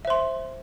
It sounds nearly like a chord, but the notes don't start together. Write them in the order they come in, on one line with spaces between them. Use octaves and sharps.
E5 C5 C6